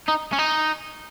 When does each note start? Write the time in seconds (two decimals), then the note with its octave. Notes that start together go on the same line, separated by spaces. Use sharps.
0.08 D#4
0.33 C#4
0.38 D#4